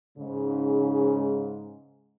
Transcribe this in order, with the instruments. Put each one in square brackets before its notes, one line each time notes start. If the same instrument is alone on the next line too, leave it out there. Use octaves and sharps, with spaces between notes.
[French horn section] G#2 C#3